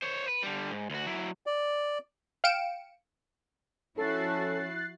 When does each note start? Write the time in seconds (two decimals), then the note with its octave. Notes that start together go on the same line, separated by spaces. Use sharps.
0.02 C5 C#5
0.28 B4
0.43 D3 G3
0.71 G#2
0.90 D2 F#4
1.07 F#3 E4
1.46 D5
2.44 F5 G5 C#7 D7 E7
3.97 F3 C#4 E4 F#4 A4 F#6 A6 C7